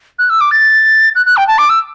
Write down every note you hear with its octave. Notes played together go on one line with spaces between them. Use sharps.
F#6
E6
D6
A6
F#6
F#6
G5
A5
D6
E6